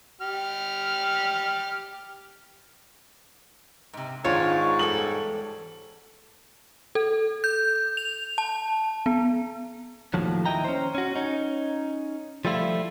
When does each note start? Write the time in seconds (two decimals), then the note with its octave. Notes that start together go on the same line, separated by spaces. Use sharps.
0.21 G4 F6
3.93 G#2 C3
4.25 G#2 D#3 D4 D#4 F4 C#5
4.79 E2 G3 A4 F#7
6.95 A4
7.44 G6
7.97 F7
8.38 A5
9.06 B3
10.14 D#2 A2 F3 F#3
10.46 D#3 E4 D#5 G5 A#5
10.64 C#4 C5
10.95 C#4 F#4
11.15 C#4 D#4
12.45 F3 G3 A3 E4 F4